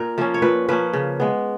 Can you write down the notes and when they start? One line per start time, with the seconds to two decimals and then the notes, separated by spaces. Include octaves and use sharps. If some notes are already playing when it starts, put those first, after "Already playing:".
Already playing: A#2 A#4
0.18 F3 A#3 C#4
0.34 C#5
0.42 A#2 B4
0.69 F3 A#3 C#4 B4
0.93 C#3
1.20 G#3 B3